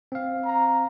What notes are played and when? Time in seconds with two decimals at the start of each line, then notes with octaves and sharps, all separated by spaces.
0.12 C4 F5
0.45 A#5